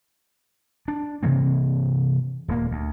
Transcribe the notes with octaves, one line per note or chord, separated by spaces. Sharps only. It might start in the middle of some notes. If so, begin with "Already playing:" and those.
D4
C3 E3 A#3 C4
D#1 A#3
D2